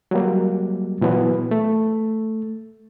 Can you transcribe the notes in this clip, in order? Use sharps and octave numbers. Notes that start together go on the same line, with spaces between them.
F#3 G3 A#3
A#2 E3 F#3 B3
A3